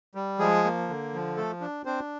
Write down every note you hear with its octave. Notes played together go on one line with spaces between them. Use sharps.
G3
F3 G#3 G#4
A#3
D3
F3
A3 A4
D4
C4 D4 C5